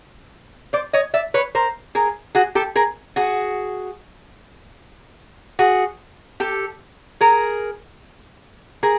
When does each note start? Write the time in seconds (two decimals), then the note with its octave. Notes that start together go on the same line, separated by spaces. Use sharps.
0.73 C5 D5
0.93 C#5 D#5
1.14 D5 E5
1.34 B4 C#5
1.55 A#4 C5
1.95 G#4 A#4
2.35 F#4 G#4
2.55 G4 A4
2.75 G#4 A#4
3.16 F#4 G#4
5.59 F#4 G#4
6.40 G4 A4
7.21 G#4 A#4
8.83 G#4 A#4